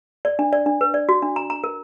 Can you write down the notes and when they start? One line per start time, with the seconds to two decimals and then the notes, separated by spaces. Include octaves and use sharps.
0.25 D5
0.39 D4
0.53 D5
0.66 D4
0.81 B4
0.94 D5
1.09 F#4
1.22 D4
1.36 A#5
1.50 A#5
1.64 A#4